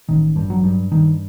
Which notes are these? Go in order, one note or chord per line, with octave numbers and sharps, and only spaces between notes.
A1 D#3
G2
F#3
G2
G2 D#3